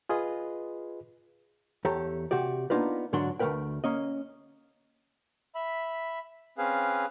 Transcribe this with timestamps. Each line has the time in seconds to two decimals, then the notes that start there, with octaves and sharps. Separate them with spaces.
0.09 F4 G#4 B4 D#5
1.85 E2 G4 A4 C#5 A#5
2.31 C3 F#4 G4 D5
2.70 A#3 B3 D4 D#4 F4 B4
3.13 G#2 D3 F#3 D4 F#4 C6
3.39 D2 A3 A#3 A#4 B4 G5
3.84 A#3 C#4 D#5
5.55 E5 B5
6.58 C4 C#4 G#4 B4 F5